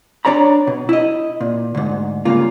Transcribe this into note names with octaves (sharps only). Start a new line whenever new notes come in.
D4 C#5 D5 A#5 B5
B2
E4 D#5
A#2
D2 G#2
G2 C#3 A#3 F4